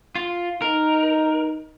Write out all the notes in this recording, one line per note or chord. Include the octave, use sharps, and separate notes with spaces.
F4
D#4 A#4